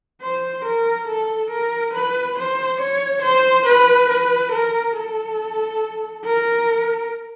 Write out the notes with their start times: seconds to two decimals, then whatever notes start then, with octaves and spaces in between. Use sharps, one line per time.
0.21 C5
0.65 A#4
1.08 A4
1.51 A#4
1.94 B4
2.38 C5
2.81 C#5
3.23 C5
3.66 B4
4.10 B4
4.52 A#4
4.96 A4
6.25 A#4